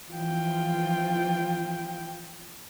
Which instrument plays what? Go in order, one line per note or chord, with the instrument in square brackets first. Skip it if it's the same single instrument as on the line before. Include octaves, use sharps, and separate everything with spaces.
[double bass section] E3 F3 [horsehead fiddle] F4 G5